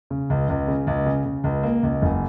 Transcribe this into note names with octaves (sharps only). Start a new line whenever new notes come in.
C#3
C#2
C#2
C#3
C#2
C#3
C#3
C#2
A#3
C#2
F#1